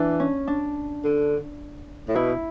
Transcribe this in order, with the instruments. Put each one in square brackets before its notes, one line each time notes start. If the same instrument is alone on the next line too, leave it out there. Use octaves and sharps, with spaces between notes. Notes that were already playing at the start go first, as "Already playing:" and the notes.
Already playing: [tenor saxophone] E3 [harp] D4
[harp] C#4
D4
[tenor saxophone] D3
A2
[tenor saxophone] B2 [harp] E4